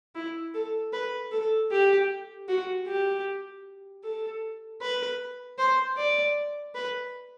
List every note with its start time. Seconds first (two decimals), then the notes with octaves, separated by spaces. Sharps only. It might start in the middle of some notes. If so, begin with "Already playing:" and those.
0.15 E4
0.55 A4
0.93 B4
1.32 A4
1.71 G4
2.48 F#4
2.87 G4
4.04 A4
4.81 B4
5.58 C5
5.97 D5
6.75 B4